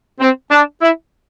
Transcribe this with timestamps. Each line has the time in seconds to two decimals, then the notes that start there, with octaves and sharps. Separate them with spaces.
0.20 C4
0.51 D4
0.81 E4